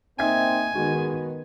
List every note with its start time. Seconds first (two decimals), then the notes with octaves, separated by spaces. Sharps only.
0.19 A#3 C4 D#4 E5 G#5 G#6
0.75 D#3 G#3 B3 F#4